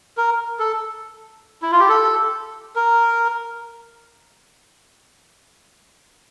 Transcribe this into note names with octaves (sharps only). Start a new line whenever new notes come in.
A#4
A4
E4
F4
G4
A4
A#4